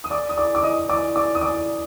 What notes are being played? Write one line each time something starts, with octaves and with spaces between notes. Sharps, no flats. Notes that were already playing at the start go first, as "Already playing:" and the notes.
D#6
D5 D6
D#6
D5 D6
D6
D#5 D#6
D5 D6
D5 D6
D#6
D5 D6